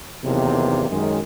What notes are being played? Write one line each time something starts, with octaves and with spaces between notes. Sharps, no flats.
B1 E2 C3 D#3 A#3 G4
F#2 D#3 G#3